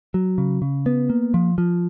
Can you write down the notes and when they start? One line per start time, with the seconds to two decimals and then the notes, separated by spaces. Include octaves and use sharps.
0.14 F#3
0.38 C#3
0.62 C#3
0.86 B3
1.10 A#3
1.34 F3
1.58 F3